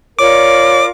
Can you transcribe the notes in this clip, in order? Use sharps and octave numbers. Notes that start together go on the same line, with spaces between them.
F4 A#4 C#5 D5 D6